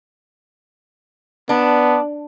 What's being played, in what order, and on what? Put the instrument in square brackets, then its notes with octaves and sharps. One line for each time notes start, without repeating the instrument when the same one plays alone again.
[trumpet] B3 [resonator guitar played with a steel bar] D4